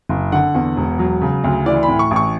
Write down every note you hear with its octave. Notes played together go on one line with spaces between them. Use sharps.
F#1
D3 F#5
E2
E1
F#3
C#3
D2
E3 D5
B5
A2
C#6
A1
C#6